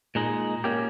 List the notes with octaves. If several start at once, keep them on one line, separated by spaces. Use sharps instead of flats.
A#2 G#3 D#4
A#2 A#3 C#4 G4